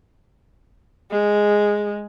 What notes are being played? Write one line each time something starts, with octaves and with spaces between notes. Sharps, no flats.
G#3